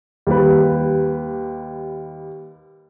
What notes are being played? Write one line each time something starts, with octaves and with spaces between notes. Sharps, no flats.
D#2 G3 B4